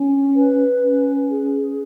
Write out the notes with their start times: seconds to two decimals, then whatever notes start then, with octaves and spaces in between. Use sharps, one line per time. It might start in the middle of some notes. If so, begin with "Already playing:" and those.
Already playing: C#4
0.34 B4
0.81 C#4
1.29 G#4